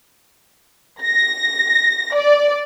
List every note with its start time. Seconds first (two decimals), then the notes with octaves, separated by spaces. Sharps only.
1.03 A#6
2.16 D5